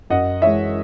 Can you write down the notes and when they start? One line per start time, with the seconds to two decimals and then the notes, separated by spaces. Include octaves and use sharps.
0.10 F#2 D#5 F#5
0.42 E3 G#3 C#5 E5